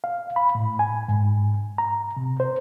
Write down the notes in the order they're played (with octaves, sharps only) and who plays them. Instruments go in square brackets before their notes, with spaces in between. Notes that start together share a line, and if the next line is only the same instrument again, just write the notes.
[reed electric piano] F5
B5
A2
G#5
G#2
A#5
C3
C5